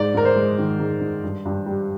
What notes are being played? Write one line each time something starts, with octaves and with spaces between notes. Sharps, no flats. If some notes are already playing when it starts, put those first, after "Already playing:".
Already playing: G#2 D5
G#2 A#4
C5
G#3
D#3
G#2
G#2
G2
G2
G3